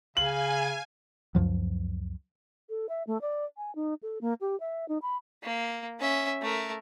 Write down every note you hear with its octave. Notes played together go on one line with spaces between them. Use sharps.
C#3 F5 G#5 F#7
C#2 F#2 F3 F#3
A4
E5
A3
D5
G#5
D#4
A4
A#3
G4
E5
D#4
B5
A#3
C#4 E5
A3 A#4